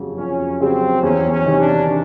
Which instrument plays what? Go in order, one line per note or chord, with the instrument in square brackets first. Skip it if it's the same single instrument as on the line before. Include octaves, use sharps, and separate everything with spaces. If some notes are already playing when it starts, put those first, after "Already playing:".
Already playing: [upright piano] F2 C#3 F#3
[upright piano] F2 [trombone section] C#4
[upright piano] C#3 F#3 [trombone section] C4
[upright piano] E2 [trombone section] C#4
[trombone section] C#4
[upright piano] C3 D#3
[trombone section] D4